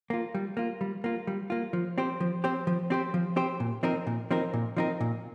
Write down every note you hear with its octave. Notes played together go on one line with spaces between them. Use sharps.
A#3 F4
G3
A#3 F4
G3
A#3 F4
G3
A#3 F4
F3
C4 G4 C5
F3
C4 G4 C5
F3
C4 G4 C5
F3
C4 G4 C5
A#2
F3 C4 D#4 A#4
A#2
F3 C4 D#4 A#4
A#2
F3 C4 D#4 A#4
A#2